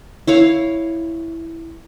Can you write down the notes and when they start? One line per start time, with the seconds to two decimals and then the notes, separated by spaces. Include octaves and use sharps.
0.28 E4 C#5 F5